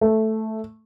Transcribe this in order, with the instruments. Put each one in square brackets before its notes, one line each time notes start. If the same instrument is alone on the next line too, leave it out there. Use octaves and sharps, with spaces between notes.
[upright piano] A3